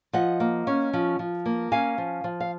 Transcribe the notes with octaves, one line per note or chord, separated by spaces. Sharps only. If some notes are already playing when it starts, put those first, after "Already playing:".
F3 D#5 F#5
A#3
C#4
F3
F3
A#3
C#4 F5 G#5
F3
F3
F5